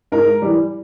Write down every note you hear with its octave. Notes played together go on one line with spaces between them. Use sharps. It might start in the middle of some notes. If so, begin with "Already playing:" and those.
G#2 A#4
E3 G3